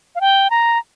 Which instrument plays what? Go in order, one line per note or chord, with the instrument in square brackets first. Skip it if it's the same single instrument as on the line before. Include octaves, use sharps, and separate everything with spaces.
[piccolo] F5
G5
A#5